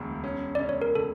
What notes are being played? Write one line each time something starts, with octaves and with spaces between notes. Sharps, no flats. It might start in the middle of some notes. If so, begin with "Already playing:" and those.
Already playing: E1 D2
C#4
C#4 D5
C#5
A#4
A4